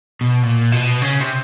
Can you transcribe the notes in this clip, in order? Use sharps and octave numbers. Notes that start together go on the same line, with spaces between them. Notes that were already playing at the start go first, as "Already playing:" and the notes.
B2
A#2
B2
C#3
C3